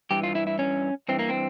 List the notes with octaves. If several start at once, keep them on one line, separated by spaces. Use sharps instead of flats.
G2 E3 G4
F4
E4
E4
C#4
G2 E3 C4
A#3
C4